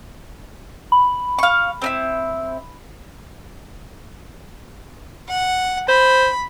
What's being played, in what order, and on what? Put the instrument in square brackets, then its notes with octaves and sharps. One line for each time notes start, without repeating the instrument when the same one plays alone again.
[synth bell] B5
[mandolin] F5 C#6
C4 D#4 E4
[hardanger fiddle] F#5
[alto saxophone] C5 [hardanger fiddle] B5